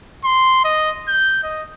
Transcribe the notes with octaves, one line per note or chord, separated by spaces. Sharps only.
C6
D#5
G6
D#5